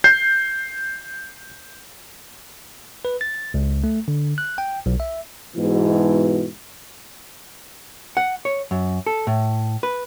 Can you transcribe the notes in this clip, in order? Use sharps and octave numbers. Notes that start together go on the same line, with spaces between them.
G6 C7
B4
A6
C#2
A3
D3
F#6
G5
B1
E5
G#2 B2 E3
F#5
C#5
F#2
A4
A2
B4